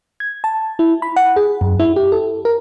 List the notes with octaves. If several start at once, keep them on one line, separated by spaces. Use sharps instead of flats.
G#6
A5
E4
B5
F#5
G#4
F#2
E4
G4
A4
A#4